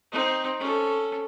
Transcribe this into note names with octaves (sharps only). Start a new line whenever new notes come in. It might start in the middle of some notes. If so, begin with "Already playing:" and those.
C4 D#4
C#4 A4